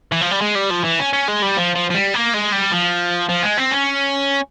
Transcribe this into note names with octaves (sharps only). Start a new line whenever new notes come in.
E3
F3
G3
G#3
G3
F3
E3
C#4
C#4
G#3
G3
F3
F3
F3
G3
A#3
G#3
G3
F3
F3
G#3
C4
C#4